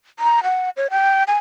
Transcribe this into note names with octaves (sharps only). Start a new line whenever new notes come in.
A#5
F#5
C#5
G5
G#5